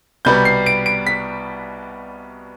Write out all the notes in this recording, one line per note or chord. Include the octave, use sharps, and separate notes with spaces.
C2 B2 G3 B3 G6
C7
D7
D7
B6